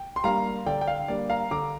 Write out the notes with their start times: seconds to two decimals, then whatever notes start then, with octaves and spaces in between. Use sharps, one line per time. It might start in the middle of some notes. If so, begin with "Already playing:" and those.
Already playing: G5
0.16 C6
0.24 G3 A#3 D4 F5 A#5
0.66 D3 D5 G5
0.81 G5
0.87 F5
1.08 G3 A#3 D4 D5
1.30 F5 A#5
1.51 D3 A#5 D6